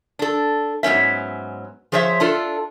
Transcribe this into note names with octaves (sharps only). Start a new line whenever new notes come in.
D4 A4
G#2 F#3 B3 C#4 E5
F3 G#4 C5 C#5 E5
D4 F4 A4